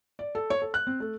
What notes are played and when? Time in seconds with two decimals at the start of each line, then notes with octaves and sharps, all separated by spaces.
0.19 D5
0.35 A4
0.50 C#5
0.62 A4
0.74 F#6
0.87 C4
1.00 A3